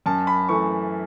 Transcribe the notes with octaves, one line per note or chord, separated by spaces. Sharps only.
F#2 A5
B5
E3 A3 C#6